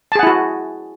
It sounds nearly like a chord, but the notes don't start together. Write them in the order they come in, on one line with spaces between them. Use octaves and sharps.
A5 G#4 F#5 E4 F#4